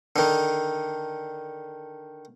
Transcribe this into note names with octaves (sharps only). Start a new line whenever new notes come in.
D3 D#3